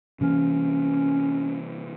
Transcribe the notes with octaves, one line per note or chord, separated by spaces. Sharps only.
C3 E3 A#3 C#4